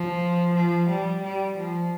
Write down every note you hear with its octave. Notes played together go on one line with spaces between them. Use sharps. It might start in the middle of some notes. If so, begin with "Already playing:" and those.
Already playing: F3
F3
G3
G3
F3